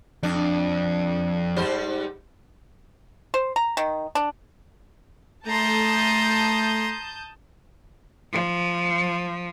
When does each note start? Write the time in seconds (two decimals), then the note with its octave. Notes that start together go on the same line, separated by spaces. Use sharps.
0.23 F2 D4
1.56 G#2 G3 C5
3.34 C5
3.56 A#5
3.77 D#3
4.15 D4
5.47 A3 A5 A#5 C6 D#6 G6
8.31 F3